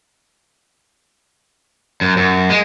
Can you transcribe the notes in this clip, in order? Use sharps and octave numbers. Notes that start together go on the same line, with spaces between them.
F#2
F#2
G#3